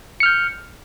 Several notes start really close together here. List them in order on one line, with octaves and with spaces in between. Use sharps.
C#7 F6 G6